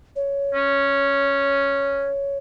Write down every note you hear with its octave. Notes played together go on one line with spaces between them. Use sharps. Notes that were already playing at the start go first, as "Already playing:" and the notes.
C#5
C#4